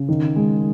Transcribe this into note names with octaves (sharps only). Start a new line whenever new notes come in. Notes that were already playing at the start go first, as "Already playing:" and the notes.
Already playing: C#3
D#3
G#3